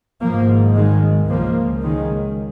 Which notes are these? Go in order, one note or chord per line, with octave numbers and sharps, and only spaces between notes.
G#1 G#2 F3 A#3
D#3 G#3
C#2 C#3 F3 A#3
D#3 G#3